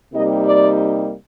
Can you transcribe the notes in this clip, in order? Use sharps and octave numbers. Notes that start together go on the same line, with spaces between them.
C3 G3 A#3 D#4 D#5
D5